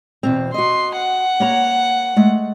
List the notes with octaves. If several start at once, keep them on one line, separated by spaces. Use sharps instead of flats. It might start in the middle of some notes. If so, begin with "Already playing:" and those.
E2 B2 C4
F#4 D#5 C6
F#5
A#3 C#5 A#5
G#3 A3